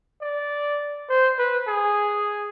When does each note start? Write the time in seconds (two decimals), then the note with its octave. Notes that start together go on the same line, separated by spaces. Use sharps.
0.21 D5
1.09 C5
1.39 B4
1.67 G#4